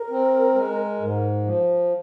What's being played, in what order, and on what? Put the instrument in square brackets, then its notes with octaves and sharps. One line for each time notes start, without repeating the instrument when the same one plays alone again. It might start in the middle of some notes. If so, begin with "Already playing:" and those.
Already playing: [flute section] A#4
[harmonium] C4
G#3
G#2
F3